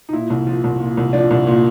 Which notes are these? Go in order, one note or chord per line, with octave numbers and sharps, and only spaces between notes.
D#4
A#2 E4
C2
F3
C2
A#2
C2
F3 D4
C2
A#2